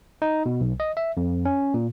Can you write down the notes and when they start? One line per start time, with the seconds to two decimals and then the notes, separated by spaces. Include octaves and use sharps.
0.22 D#4
0.46 B2
0.61 B1
0.80 D#5
0.97 E5
1.17 F2
1.45 C#4
1.74 A#2